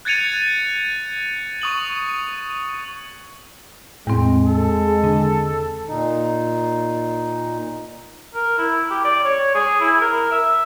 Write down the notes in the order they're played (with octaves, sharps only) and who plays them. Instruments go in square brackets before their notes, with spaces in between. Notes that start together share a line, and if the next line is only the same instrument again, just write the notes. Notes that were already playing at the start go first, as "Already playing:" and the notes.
[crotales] F#6 G#6 A6 C#7 D#7 F7
C#6 D#6 F#7
[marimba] E2 C4 [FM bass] A2 [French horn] G#3
[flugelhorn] A4
[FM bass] D3
[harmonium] A#2 D#4
[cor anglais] A#4
E4
G4
D5
C#5
G#4
E4
A#4
E5